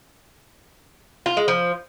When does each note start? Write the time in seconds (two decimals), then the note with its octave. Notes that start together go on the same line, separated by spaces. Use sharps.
1.26 F4
1.37 G#3
1.48 F3